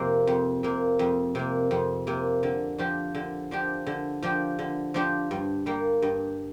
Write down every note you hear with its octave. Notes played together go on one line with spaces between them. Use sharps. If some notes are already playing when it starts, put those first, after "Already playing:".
Already playing: F2 C3 A#3
F2
C3 A#3
F2
C3 A#3
F2
C3 A#3
D3
F3 D4 G4
D3
F3 D4 G4
D3
F3 D4 G4
D3
F3 D4 G4
G2
G3 A#3
G2